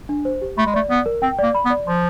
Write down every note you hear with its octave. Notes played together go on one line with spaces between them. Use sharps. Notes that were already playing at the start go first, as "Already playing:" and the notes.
D4
C5
G4
A3 B5
G#3
A3 D5
B3 D5
A#4
C4 G5
A#3 D5
B5
B3
D5
F3 C6